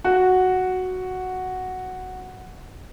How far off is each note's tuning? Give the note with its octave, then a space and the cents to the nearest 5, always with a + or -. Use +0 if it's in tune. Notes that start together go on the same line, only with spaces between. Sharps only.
F#4 +0